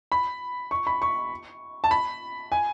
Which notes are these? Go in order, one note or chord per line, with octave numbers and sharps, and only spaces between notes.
B5
C#6
B5
C#6
A5
B5
G#5